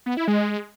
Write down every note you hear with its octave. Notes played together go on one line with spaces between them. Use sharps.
B3
E4
G#3